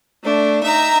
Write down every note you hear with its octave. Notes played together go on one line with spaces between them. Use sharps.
A3 D4
D#4 E5 A#5